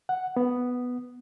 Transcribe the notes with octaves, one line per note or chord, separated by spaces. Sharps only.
F#5
B3